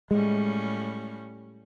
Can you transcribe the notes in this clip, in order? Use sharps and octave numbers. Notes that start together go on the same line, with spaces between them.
A2 G3 G#3 C#4